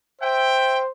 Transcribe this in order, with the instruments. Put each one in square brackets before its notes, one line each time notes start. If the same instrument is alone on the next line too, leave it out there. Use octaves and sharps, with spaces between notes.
[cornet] C5 [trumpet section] E5 G5